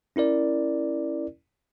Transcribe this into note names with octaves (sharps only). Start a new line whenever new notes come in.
C#4 E4 A#4 D5